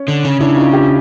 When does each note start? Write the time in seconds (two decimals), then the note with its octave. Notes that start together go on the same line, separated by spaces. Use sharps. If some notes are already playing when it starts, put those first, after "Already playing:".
Already playing: C#4
0.08 D3
0.25 C#3
0.40 C#3 D4 E4
0.56 D#4 F4
0.73 F4 G4